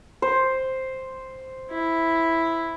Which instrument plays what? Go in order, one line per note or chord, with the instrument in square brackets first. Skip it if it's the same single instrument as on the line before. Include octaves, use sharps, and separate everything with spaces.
[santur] C5
[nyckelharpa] E4